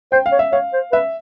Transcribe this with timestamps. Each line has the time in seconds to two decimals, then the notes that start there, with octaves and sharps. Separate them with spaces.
0.12 C5 G5
0.26 F5
0.32 C#5
0.39 E5
0.53 C#5 F5
0.73 C5
0.93 B4 E5